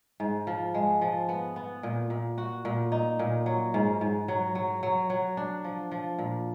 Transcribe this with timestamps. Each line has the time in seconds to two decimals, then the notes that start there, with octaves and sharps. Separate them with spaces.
0.20 G#2
0.47 F3
0.74 G#3
1.01 F3
1.29 B3
1.56 B3
1.83 A#2
2.10 A#2
2.38 F#4
2.65 A#2
2.92 D#4
3.19 A#2
3.46 F#3
3.74 G#2
4.01 G#2
4.28 F#3
4.55 F#3
4.83 F#3
5.10 F#3
5.37 D4
5.64 F3
5.91 F3
6.19 A#2